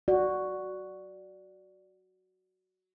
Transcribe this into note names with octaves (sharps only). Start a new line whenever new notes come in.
F#4 D5